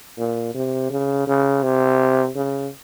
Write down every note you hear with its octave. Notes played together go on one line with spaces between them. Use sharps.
A#2
C3
C#3
C#3
C3
C#3